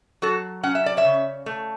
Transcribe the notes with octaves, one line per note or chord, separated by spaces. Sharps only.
F#3 F#4 A4
C#4 F#5
E5
D5
C#5 E5
C#3
A3